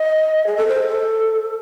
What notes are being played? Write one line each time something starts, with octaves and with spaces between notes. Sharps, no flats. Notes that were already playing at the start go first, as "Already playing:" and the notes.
Already playing: D#5
G#4
A4
C5
A4